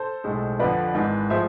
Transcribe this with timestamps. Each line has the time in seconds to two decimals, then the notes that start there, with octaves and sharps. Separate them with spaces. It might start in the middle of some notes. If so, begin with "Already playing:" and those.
Already playing: A4 C5
0.24 B1 A2 G#3
0.59 F2 D3 F3 B4 D5
0.95 G#1 G#2 E3
1.30 A2 F3 G#3 C5 E5